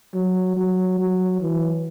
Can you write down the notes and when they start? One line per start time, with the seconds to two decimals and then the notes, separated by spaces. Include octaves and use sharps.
0.14 F#3
0.56 F#3
0.99 F#3
1.41 E3